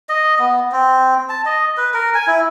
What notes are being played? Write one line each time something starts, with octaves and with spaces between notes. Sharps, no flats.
D#5
B3
C4
A5
D#5
B4
A#4
G#5
E4